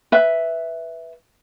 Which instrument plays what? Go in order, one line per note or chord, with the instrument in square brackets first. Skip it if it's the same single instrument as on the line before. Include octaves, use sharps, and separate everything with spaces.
[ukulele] B4 E5